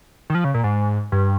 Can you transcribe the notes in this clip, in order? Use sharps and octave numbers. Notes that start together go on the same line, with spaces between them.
D#3
F3
C#3
A#2
G#2
G2